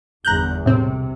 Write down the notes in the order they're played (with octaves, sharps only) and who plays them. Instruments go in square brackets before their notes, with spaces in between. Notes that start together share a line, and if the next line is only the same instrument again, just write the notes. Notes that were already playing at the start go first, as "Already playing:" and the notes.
[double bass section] G1 E2 [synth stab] A#5 F#6 G6
[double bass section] C2 C3 [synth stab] A2 C4